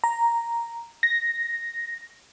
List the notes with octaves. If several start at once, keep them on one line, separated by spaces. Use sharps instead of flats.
A#5
A#6